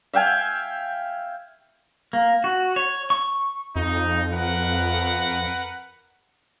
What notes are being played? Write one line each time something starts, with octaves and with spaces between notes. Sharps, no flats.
E5 F5 G5 G#5
A#3
F#4
C#5
C#6
F2 D#4
A#4 B4 F#5